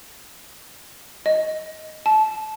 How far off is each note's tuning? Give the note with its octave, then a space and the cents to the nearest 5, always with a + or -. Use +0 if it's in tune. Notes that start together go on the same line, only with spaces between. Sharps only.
D#5 +5
A5 -25